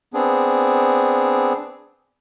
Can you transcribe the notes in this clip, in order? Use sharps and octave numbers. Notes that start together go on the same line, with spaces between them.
B3 C4 D4 G#4